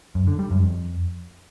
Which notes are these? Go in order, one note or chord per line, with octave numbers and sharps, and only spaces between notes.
F#2
D3
G3
F#2
F2